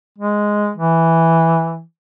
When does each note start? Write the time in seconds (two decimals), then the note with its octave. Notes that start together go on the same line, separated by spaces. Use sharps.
0.19 G#3
0.77 E3